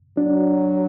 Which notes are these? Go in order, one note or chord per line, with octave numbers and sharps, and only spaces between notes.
F#3 D4